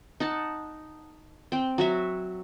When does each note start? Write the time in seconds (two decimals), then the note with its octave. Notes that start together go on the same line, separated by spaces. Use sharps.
0.20 D#4 F#5 A5
1.52 C4 G5
1.78 F#3 F#4 E5